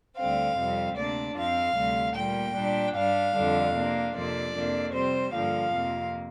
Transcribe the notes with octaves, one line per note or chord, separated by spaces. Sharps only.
D2 D3 G3 C4 F5
F2 C3 G3 C4
D2 C3 A#3 D4 D5
F2 F3 C4 F5
D2 C3 G3
A#2 G3 A#3 G5
A#2 G3 D4
G2 G3 D4 F5
F2 D3 G3 D4
C3 A#3 D4
F2 C3 F3 A#3 D4 D5
F2 C3 A#3 D4
C3 G3 C4 C5
G2 D3 F3 A#3 F5
F2 C3 A#3